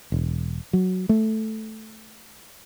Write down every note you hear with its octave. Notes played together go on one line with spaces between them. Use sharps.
E1
F#3
A3